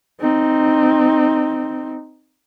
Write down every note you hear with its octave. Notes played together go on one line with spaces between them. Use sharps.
C4 D#4